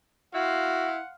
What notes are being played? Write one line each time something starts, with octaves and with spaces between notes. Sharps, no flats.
E4 F#4 F5 F#5 C6